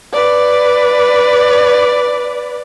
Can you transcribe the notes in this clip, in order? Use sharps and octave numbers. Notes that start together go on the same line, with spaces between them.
B4 D5